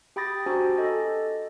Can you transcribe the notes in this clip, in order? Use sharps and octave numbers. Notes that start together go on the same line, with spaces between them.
G4 G5 B5 D#6 A6 A#6
D4 F#4 G4 C5 G#5 A#5
A4 D#5 A6